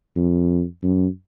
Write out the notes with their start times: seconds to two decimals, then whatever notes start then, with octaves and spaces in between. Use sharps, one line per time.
0.16 F2
0.83 F#2